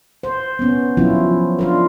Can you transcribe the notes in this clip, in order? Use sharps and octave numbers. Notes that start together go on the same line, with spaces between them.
C5
B3 C#4
F3 F#3 C#4 E4 F4
D4 F4 A#4